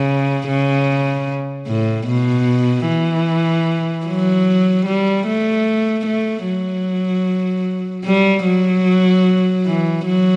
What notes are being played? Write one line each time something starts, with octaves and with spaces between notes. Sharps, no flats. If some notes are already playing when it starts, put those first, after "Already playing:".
Already playing: C#3
C#3
A2
B2
E3
F#3
G3
A3
A3
F#3
G3
F#3
E3
F#3